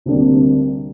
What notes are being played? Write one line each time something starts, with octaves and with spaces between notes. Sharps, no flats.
D2 C3 G3 A#3 D4